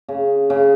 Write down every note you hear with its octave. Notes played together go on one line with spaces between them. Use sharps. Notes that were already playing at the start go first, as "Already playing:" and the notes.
C#3
C#3